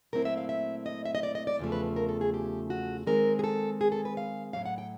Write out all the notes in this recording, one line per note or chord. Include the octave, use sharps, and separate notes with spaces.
A#2 F#3 A3 C4 E4 A#4
E5
F5
E5
D#5
E5
D#5
D5
D#5
D5
E2 C#3 F3 A3
B4
A#4
A4
G#4
G4
F#4
D#3 G#3 C4 A#4
G#4
A4
G#4
A4
B4
F5
A2 F#3 A#3 F5
F#5
G5